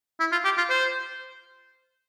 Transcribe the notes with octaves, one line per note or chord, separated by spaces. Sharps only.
E4
F4
G4
F4
C5